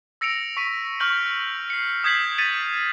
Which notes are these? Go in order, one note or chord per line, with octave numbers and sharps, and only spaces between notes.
E6 A#6 C#7 D7 F7
C#6 B6 D#7
C#6 F6 G6 F#7
C7 C#7
D#6 G6 G#6 B6 C7 F#7
G#6 A6 B6 C#7 D#7 F7